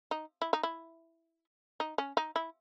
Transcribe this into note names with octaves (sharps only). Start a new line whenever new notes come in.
D#4
E4
D#4
E4
D#4
C#4
D#4
E4